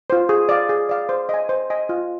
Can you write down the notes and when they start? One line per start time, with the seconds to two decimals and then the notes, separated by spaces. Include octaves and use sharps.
0.10 F4 C5
0.29 G#4
0.49 D5 F5
0.69 G#4
0.89 D5 F5
1.09 C5
1.29 D#5 G#5
1.49 C5
1.70 D#5 G#5
1.89 F4